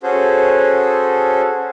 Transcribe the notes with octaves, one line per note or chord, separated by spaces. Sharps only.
C#4 F#4 G#4 A4 C5